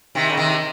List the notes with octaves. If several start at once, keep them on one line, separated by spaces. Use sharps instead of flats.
C3 D#3
C#3
C3 D#3